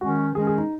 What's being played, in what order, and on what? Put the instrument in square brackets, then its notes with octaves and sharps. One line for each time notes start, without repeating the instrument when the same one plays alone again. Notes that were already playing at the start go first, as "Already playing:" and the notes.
[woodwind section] D#3 G#3 C#4 [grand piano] F#4
[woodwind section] D#3 G#3 C#4 [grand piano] G#4
[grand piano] G#4
D#4